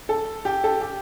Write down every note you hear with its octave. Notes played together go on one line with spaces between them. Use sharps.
A4
G4
A4
G4